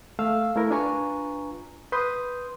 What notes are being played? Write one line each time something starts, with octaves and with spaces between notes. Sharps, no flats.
A3 F5 E6
A3 E4 A#4
D4 F4 B4 G#5 A#5 C#6
B4 C6 D#6 G6